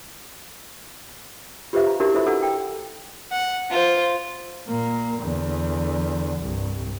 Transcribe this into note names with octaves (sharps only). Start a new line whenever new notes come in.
F4 G4 B4 C5 E5 F5
A#5
D4 E4 F#4 G4 A#4 E5
E4 A4 B4 C5 E5 B5
D4 A4 F#5 A#5 E6
G5
F#5
F4 C5
A#2 A#3
E2 D3
C2 G2